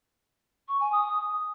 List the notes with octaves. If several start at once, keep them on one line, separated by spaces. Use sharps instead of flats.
C#6
G#5
D#6